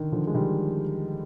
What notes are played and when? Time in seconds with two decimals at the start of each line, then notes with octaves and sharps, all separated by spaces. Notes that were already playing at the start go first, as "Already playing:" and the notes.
Already playing: D3 D#3
0.12 D3 F3
0.27 G#3
0.34 D#3 G3